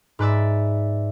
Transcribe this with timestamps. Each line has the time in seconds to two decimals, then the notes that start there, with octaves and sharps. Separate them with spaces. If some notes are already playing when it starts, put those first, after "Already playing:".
0.19 G#2 B4 D5 E5